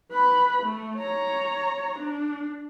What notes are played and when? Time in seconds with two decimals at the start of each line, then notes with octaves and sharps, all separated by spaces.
0.13 B4 B5
0.63 A3
0.96 C#5 A#5
2.00 D4